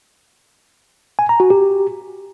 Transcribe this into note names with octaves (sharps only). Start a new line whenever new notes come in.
G#5
A#5
F#4
G4